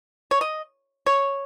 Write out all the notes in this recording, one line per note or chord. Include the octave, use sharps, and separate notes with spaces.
C#5
D#5
C#5